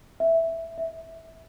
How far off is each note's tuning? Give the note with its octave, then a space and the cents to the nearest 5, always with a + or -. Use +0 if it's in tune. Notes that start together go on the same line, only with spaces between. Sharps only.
E5 +0
E5 -15